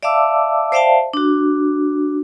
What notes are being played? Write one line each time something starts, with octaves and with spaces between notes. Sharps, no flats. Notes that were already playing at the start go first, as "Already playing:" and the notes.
D5 E5 F5 A5 D6 E6
C5 D5 E5 F5 G5 A5
D4 F#4